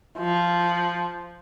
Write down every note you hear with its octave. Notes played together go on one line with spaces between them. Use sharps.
F3